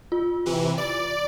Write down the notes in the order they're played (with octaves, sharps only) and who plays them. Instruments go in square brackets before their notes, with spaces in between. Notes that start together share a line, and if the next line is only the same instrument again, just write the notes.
[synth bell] F4
[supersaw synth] C3 E3
D5